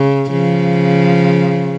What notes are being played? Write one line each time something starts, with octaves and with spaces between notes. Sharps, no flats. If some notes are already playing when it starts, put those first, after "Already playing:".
Already playing: C#3
C#3 F3